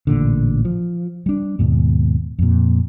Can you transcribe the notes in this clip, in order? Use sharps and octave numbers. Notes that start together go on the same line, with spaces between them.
A1 A#2 D3
F3
G3 D4
D#2 G#2 B2
F2 A#2